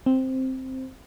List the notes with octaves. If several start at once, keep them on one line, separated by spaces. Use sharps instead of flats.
C4